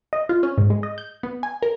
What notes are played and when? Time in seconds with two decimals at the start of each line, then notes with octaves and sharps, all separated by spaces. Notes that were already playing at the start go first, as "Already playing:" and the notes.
0.13 D#5
0.29 F4
0.43 C#4
0.58 G#2
0.70 G#3
0.83 D#5
0.98 G6
1.23 B3
1.43 G#5
1.62 A#4